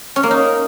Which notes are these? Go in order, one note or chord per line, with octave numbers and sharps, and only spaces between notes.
C#4
A#3
D#4